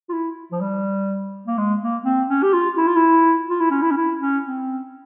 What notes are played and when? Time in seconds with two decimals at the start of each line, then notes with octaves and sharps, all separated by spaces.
0.09 F4
0.13 E4
0.52 F3
0.61 G3
1.47 A#3
1.58 G#3
1.81 A#3
2.05 C4
2.29 C#4
2.43 G4
2.53 F4
2.77 E4
2.87 F4
2.96 E4
3.49 F4
3.61 E4
3.71 C#4
3.82 E4
3.91 C#4
3.97 E4
4.21 C#4
4.45 C4